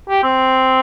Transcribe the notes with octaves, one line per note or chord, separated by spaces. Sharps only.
G4
C4